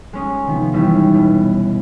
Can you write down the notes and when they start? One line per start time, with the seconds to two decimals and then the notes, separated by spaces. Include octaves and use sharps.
0.13 G#3 C#4 D#6
0.46 C3 D#3 F3 B3
0.73 D#2 E3 G3 B3 C#4 D#4
1.14 B2